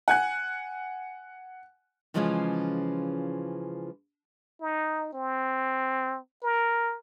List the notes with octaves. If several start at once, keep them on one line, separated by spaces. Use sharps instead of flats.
F#5 G#5 F#6
C#3 E3 F3 G#3 C#4 F4
D#4
C4
A#4